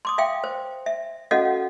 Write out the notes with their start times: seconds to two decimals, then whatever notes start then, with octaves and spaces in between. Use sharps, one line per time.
0.05 C6 D6 D#6
0.18 E5 F5 G5
0.44 C5
0.86 E5
1.31 C#4 F#4 A4 D#5 F5 F#5